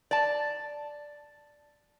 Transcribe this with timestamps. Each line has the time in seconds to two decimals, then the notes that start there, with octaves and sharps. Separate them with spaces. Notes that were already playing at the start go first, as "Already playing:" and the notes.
0.11 D5 A5